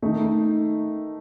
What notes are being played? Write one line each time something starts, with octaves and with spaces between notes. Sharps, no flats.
D#3 A3 D#4